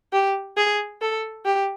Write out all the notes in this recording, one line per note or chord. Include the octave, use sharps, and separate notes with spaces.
G4
G#4
A4
G4